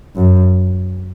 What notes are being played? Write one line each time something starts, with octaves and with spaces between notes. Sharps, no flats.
F#2